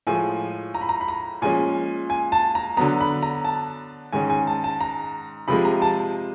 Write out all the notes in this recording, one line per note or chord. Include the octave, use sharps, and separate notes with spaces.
A2 F3 G#3 G#5
A#5
B5
A#5
B5
A#5
A#2 F3 G#3 C#4 G#5
G#5
A5
A#5
D3 F#3 B3 A#5
B5
A#5
A5
G#2 D#3 G#3 C#4 G#5
G#5
A5
A5
A#5
C3 F3 G#3 B5
A#5
A5